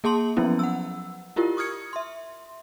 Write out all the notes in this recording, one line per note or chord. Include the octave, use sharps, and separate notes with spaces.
A#3 G#4 A5 C6 F#7
F3 F#3 B3 C#4 E4
F#5 E6
E4 F4 G4 A#4
C#6 D#6 F6 G#6 C#7
E5 C6